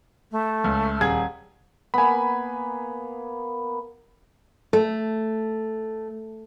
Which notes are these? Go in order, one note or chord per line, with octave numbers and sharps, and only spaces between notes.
A3
C#2
D#1 G#4 G#6
A#3 B3 G#5 B5
A3 A4